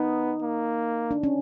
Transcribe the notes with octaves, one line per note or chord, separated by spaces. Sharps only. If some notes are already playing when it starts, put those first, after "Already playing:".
Already playing: B3 D#4
A#3
D4
C#4